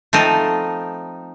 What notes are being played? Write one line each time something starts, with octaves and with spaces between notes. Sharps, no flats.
F3 A3 C4 D#4